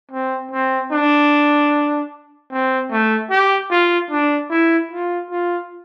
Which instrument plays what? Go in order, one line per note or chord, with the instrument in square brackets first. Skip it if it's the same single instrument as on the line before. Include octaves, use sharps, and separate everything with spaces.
[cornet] C4
C4
D4
C4
A3
G4
F4
D4
E4
F4
F4